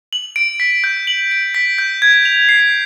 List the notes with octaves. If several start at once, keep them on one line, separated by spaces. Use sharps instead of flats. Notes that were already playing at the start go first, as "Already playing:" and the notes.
F#7
D7
B6
G6
F#7
D7
B6
G6
G#6
F7
C7